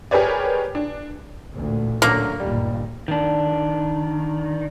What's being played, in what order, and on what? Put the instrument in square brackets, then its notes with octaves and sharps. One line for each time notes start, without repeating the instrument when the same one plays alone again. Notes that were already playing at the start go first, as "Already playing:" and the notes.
[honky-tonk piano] G4 G#4 A#4 B4 C#5 D5
D4
[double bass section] A1 D2 A#2
[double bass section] A#2 [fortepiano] D3 F#3 C#4 [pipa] A#3
[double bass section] G1 D#2 A#2 [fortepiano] G3
[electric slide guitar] D#3 D4